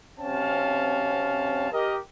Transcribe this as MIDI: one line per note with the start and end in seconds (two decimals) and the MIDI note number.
0.20 1.70 35
0.20 1.70 48
0.20 1.70 60
0.20 1.70 61
0.20 1.70 77
0.20 1.70 81
1.72 1.96 67
1.72 1.96 70
1.72 1.96 75